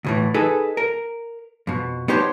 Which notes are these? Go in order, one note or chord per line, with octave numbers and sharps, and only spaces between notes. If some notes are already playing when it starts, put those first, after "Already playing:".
D2 A2 E3
D#4 G#4 A4 B4
A#4
F2 B2
B3 D#4 G4 C5 C#5 A5